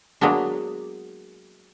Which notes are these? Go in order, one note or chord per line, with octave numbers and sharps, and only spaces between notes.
F#3 G#3 A#3 B3 D4